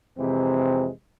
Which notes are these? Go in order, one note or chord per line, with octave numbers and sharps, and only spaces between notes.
F2 C3 E3 G#3 C4